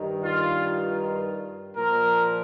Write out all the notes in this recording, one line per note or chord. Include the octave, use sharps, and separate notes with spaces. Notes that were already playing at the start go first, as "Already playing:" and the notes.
Already playing: G2 D#3
F4
A#2 F3 A#4